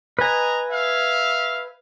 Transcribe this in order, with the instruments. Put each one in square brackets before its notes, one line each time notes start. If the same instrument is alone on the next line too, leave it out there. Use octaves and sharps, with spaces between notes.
[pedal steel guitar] B4 G#5 [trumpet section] D#5 A#5
[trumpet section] E5 F5